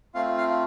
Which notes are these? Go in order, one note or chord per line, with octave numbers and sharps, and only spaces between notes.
A3 C4 F4 F5
F5